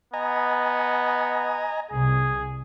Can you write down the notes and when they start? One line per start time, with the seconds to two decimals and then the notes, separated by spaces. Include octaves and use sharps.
0.14 B3 D#5 G#5 A#5
1.91 C2 G#4